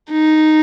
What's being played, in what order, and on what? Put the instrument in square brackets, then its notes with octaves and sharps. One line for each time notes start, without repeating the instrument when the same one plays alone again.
[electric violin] D#4